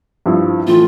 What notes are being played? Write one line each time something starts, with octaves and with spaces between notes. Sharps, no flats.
G2 F3 C4 E4
A2 E3 A3 F4